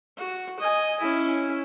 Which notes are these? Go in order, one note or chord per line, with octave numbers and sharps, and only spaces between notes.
F#4
D#5 G#5
C#4 E4